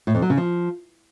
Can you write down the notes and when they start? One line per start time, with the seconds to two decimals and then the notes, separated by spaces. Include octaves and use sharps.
0.07 A2
0.15 F2
0.22 F#3
0.30 C#3
0.37 F3